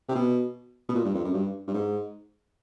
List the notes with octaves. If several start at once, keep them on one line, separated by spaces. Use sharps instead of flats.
C3
B2
B2
A#2
G2
F2
F#2
G2
G2
G#2